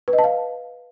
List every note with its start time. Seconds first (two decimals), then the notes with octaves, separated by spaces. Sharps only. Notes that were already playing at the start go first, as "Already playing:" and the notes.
0.08 B4
0.13 D#5
0.19 A5
0.24 F5